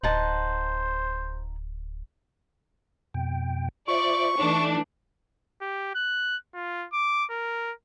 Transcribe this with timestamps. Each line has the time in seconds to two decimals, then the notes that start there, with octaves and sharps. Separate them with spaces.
0.03 D1 D#4 C5 F#5 A5
3.14 F2 B2 G5
3.88 F4 C5 D5 E5 C#6
4.39 E3 A3 D4 D#4
5.62 G4
5.95 F#6
6.54 F4
6.93 D6
7.31 A#4